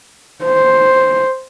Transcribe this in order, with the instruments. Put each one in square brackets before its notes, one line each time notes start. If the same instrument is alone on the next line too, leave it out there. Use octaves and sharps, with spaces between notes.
[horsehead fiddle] C5